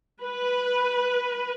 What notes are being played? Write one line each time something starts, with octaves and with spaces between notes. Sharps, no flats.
B4